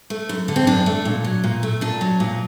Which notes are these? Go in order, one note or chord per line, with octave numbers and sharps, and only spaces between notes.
A3
F#2
D3
C4
F#2 D4
A3
A#2
F#3
A#2
A3
A#2 D4
F#3
A#2